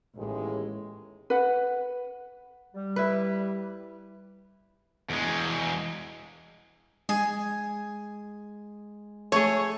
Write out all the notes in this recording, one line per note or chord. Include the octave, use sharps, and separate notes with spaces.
A1 D#2 A2 G#3
B4 F#5
G3
E4 B4
E2 G#3
G#3 G#4
A3 G#4 C#5